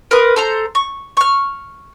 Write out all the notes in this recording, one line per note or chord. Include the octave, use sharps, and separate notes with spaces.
A#4 B4 C6 D#6
A4 C5 A#5
C#6
C#6 F6